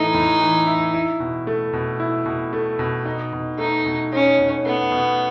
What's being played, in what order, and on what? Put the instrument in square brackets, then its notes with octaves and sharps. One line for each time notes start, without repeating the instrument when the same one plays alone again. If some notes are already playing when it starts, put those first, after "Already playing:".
Already playing: [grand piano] A2 E3 A3 E4 [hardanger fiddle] D#4
[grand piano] A2
E3
E4
E4
B2
A3
B2
E4
B2
A3
B2
D#4
B2
[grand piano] A3 [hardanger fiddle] D#4
[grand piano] B2
[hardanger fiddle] C#4 [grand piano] D#4
[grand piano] B2
[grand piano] A3 [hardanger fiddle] B3
[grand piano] B2